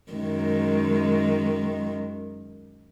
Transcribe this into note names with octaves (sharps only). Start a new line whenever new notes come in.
F#2 D#3 G#3